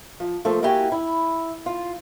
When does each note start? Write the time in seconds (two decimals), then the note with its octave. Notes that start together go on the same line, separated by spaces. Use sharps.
0.20 F3
0.45 F3 A3 A#3 A4 C5
0.63 A#3 E4 F#4 G4 G#5
0.92 E4
1.66 F4